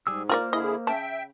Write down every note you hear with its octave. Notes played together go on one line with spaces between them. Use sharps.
G#2 G3 G#4 E6
A#3 F4 A#4 C5 D5 F6
D3 E4 G#4 D#5
C#3 E5 G5 A5